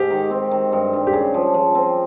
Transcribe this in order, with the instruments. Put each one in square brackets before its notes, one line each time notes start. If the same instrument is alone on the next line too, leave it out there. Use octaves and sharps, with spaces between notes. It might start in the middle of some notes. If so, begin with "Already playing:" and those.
Already playing: [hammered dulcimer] G#2 [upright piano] G4
[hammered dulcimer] D#3
C4
D#3
G2
G2
[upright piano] G4
[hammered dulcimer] C#3 [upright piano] G#4
[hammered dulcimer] F3
F3
C4